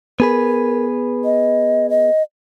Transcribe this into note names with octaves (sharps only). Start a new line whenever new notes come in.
B3 G#4 A#4 B4
D#5
D#5